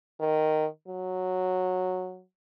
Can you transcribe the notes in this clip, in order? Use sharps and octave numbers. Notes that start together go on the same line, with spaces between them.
D#3
F#3